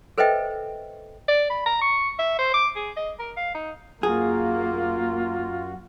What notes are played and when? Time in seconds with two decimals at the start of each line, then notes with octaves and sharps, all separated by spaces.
0.18 A4 B4 C5 D#5 E5 G5
1.28 D5
1.50 B5
1.66 A#5
1.82 C#6
2.19 E5
2.39 C5
2.54 D6
2.76 G#4
2.97 D#5
3.19 A#4
3.37 F5
3.54 D#4
4.03 F#2 A#3 F4 F#4 G#4